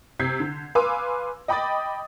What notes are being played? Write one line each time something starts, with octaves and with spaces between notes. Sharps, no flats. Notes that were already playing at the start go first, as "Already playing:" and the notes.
C3 G6 G#6 B6 C7
D3
B4 F5 G#5 C6 D6 E6
D#5 G5 B5 D6 D#6 A6